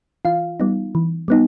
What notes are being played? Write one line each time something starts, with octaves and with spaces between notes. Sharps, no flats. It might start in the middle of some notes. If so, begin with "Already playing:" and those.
E3 F4 F5
G3 B3 D#4
E3
G3 B3 D#4